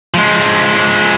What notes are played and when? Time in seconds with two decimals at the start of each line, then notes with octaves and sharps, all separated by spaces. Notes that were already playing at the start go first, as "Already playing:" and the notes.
0.14 F3 G#3